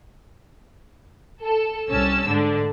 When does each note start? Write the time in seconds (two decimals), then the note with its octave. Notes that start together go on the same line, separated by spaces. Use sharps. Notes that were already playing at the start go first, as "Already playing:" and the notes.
1.43 A4
1.89 C2 C#4 A5 E6
2.28 G#2 D3 D4